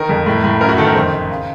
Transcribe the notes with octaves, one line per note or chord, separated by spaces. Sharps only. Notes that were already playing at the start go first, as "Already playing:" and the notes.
Already playing: D#3 A#4
F2
A2
A2
F#2 A#4
F#4
D#3 A4
A#4
F2 C5
D#3
C#3